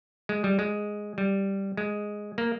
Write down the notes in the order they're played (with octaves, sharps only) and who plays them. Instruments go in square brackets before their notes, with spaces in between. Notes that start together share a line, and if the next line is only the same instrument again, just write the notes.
[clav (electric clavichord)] G#3
G3
G#3
G3
G#3
A#3